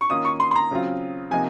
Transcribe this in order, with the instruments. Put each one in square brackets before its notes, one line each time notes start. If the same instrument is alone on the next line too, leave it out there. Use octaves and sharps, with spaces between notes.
[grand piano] C#6
[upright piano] D#3 A#3 C#4 F4 [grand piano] D#6
[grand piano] C#6
C6
C6
A#5
[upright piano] C#3 F#3 C4 F4
[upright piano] C3 F3 A#3 D#4 [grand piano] G#5